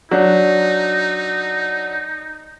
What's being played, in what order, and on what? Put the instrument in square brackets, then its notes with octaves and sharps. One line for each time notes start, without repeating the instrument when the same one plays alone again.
[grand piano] F#3 D4 [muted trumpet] D#4